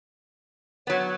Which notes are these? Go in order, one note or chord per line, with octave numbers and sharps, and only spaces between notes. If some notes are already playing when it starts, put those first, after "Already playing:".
F#3 B3 C#5